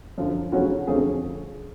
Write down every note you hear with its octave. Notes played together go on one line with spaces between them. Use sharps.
F#2 D3 F3
D2 C#3 F#3 C#4 F#4
F2 D3 F3 A3 C#4 G#4